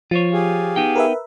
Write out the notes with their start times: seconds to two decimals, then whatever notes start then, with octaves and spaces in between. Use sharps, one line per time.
0.11 F3 F4 C5 C#5
0.33 G4 G#4 F5
0.76 B3 D#4 G5
0.96 A#4 B4 E5